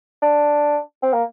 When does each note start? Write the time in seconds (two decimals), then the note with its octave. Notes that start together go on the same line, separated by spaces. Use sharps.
0.22 D4
1.03 C4
1.13 A#3